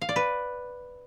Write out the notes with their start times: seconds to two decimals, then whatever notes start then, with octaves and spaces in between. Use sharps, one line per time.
0.01 F5
0.09 D5
0.16 B4